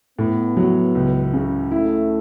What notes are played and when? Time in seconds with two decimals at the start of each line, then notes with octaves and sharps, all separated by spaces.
0.19 A2 B3
0.57 F#3
0.95 C#2
1.33 C#3
1.71 A3 E4